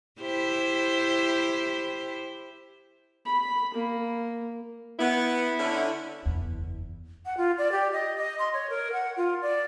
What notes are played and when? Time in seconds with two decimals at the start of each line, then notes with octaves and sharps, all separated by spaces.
0.21 E4 G4 C5
3.25 B5
3.74 A#3
5.00 B3 E4
5.59 D3 C#4
6.26 F#1 E2
7.26 F#5
7.37 F4
7.58 D5
7.72 G4
7.92 D#5
8.17 D#5
8.39 C6
8.54 C#5
8.70 A#4
8.93 F#5
9.17 F4
9.42 D5